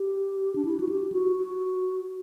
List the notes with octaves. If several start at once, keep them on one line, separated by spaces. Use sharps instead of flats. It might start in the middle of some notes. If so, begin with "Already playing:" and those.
Already playing: G4
D4
E4
F#4
G4
F#4
F#4